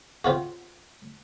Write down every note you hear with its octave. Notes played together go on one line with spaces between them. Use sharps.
C3 F4 F#4